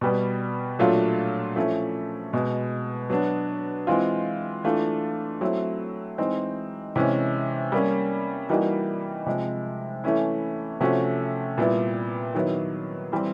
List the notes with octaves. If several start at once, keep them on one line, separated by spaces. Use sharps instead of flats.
B2 G3 B3
A#2 F#3 A3 D4 F4
F3 A3 C#4 E4
B2 G#3 B3
F#3 B3 D4 F#4
E3 G#3 C4 F4
E3 A3 D4 F4
F#3 A3 C4 E4
E3 G#3 C4 D#4
C3 E3 G#3 C#4
G3 A#3 C#4
E3 G3 A#3 D#4 F#4
C3 F3 G#3
E3 A3 C#4 E4
C3 F3 A3 C#4 F#4
A#2 G3 B3 E4
D#3 F#3 B3 E4
E3 G3 C4